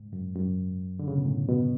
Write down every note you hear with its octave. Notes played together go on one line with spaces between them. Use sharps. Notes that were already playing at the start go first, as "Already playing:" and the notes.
Already playing: G#2
F#2
F#2
D3
C#3
B2
A2
B2